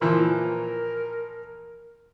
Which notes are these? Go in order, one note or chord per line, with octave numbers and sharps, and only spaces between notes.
A#2 E3 F3 A#4